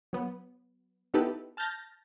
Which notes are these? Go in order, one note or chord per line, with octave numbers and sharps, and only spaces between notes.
F#3 B3
B3 D#4 E4 G4 A4 B4
A5 F6 G6 A6 A#6